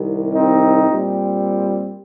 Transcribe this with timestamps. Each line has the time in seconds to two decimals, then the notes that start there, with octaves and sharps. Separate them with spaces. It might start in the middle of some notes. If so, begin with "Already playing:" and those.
Already playing: C2 C3 D#3
0.34 C4 D#4
0.87 A#2 G3 C4